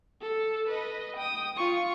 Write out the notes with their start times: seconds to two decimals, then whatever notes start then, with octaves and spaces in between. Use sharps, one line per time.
0.21 A4
0.68 B4 D#5
1.16 G5 D#6
1.57 F4 C#6